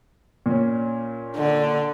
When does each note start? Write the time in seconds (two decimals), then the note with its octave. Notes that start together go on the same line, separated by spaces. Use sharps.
0.46 A#2 C#4
1.37 D3